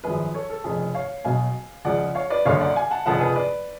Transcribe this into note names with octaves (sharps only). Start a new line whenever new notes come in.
G#1 F#2 F3 G#4 B4
A4 C#5
A4
F1 F2 C#3 G#4
C#5 F5
B1 B2 F#3 F5 G#5
C#2 C#3 F3 D5 F#5
C#5 F5
B4 D5
F#1 F#2 D3 C#5 F5
D5 F#5
F5 G#5
F#5 A5
F1 F2 C#3 F3 F#5 A5
G#4 B4
B4 D5